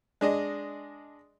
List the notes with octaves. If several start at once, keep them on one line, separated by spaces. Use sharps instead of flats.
G#3 D4 D#5